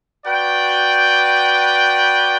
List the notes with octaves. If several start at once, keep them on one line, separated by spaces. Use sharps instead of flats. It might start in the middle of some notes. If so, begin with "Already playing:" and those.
F#4 B4 D5 G5